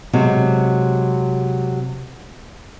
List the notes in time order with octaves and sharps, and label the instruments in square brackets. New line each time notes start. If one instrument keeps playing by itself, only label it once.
[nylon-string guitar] C3 F#3 G#3